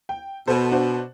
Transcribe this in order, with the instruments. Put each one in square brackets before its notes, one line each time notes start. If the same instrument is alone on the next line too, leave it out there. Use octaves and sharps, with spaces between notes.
[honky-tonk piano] G5
[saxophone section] B2 [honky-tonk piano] A4 C5
[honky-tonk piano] D4 F#4 C5